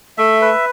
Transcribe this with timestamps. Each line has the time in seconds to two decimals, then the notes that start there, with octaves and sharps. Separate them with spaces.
0.18 A3 E5
0.41 B4